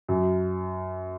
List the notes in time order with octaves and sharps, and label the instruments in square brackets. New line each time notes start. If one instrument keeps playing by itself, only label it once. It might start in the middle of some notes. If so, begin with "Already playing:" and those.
[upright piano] F#2